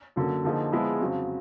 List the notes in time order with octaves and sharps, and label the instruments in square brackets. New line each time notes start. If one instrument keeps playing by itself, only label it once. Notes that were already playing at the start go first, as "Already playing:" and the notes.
[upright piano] F#2 D3 F#3 A#3
D3 F3 A#3 D#4 G#4
F3 G#3 B3 E4 G#4
F2 C#3 F#3